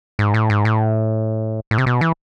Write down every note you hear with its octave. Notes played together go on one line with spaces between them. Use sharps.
G#2
A2
G#2
A2
A2
C3
B2
E3